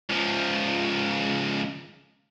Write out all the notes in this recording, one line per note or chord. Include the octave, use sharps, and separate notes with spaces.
C#2 F3